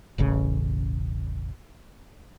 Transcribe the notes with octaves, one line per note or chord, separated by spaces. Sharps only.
E1 A1 C#3